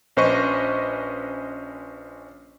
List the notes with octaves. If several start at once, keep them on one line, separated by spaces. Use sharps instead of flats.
A#1 C#4 B4 C5 D#5 C#6